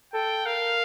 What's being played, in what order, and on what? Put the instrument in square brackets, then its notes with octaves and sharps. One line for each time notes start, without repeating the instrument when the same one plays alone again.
[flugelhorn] A4 [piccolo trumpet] G5
[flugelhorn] A#4 [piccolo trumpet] F5